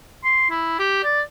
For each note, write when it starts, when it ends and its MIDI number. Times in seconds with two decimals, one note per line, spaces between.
0.24 0.48 84
0.50 0.79 64
0.79 1.00 67
1.04 1.21 74